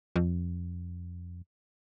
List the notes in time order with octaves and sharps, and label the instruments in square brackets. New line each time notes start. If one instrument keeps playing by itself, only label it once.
[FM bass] F2